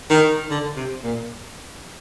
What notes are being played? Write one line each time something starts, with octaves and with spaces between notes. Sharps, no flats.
D#3
D3
C3
A#2